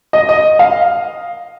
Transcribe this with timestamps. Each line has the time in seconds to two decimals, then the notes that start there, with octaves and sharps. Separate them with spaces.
0.13 D#5
0.29 D#5
0.59 F5